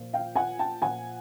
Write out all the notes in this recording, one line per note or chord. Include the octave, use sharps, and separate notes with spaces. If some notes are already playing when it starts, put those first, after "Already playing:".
Already playing: A#2 F3
F5 G5
F#5 G#5
G5 A5
A#2 F3 F#5 G#5